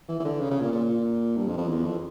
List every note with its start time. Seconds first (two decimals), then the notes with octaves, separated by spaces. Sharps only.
0.09 E3
0.20 E3
0.25 D3
0.40 C#3
0.50 C#3
0.61 A#2
0.72 A#2
1.36 G2
1.47 F2
1.58 F2
1.69 E2
1.85 F2